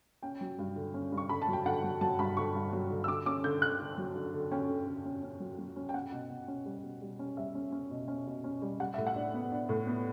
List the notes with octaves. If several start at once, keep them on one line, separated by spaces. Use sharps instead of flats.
C#4 G5
F#3
G2
D3
C#4
G2
C#6
D3 B5
A5
F#3
G5
D3 F#5
F#3
F#3 A5
G2 B5
D3 C#6
G2
F#3
D3
E6
D3 D6
C#4 D6
D3 G6
D3 F#6
D3
F#3
D3
D3
C#4 G5
D3
D3
C#4
C#4
F#3
F#3
C#4
G5
C#4 F#5
B2
B2
C#4
G3
B2
G3
C#4
G3 E5
C#4
C#4
B2
C#4
B2
C#4
G3
G3 F#5
A2 E5
F#5
D4
B3
D4
A2
B3